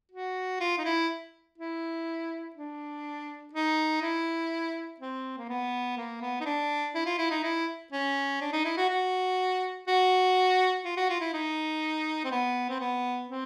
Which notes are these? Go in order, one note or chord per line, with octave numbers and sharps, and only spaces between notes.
F#4
F4
D#4
E4
E4
D4
D#4
E4
C4
A#3
B3
A#3
B3
D#4
D4
E4
F4
E4
D#4
E4
C#4
D4
D#4
E4
F#4
F#4
F#4
F4
F#4
F4
E4
D#4
C4
B3
C4
B3
C4